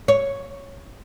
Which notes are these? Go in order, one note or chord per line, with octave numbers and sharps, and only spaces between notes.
C#5